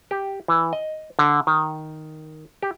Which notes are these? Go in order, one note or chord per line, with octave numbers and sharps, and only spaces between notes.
G4
E3
D#5
D3
D#3
G4